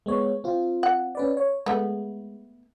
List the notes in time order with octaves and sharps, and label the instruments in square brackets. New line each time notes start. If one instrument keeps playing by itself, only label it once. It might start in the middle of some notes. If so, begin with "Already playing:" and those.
[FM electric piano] G#3 B3 C#5
C4 F4
[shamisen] F#5
[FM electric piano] C#4 B4 D5
C#5
[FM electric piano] G#3 [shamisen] A3 B3